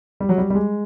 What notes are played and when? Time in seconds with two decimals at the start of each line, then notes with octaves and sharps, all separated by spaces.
0.20 G3
0.29 F#3
0.38 G3
0.50 G3
0.55 G#3